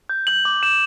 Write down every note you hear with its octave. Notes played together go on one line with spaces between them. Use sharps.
G6
G6 F#7
D6
G6 E7